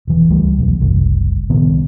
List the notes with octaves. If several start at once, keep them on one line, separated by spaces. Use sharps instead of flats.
E1 E3
C#2 G3 A3
B1 E2
F#1 C2
C2 A#2 D#3 B3